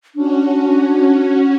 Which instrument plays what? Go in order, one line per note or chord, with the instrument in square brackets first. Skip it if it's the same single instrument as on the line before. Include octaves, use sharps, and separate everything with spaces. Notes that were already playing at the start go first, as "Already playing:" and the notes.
[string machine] C#4 F#4 [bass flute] D4